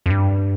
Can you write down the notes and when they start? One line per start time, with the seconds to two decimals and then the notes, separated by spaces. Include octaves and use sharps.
0.06 F2
0.10 G2